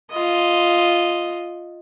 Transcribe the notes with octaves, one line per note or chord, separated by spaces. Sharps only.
F4 D#5